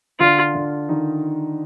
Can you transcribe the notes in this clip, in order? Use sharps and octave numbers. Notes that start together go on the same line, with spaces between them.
D3 D4 F4
D3 D4
D#3 D#4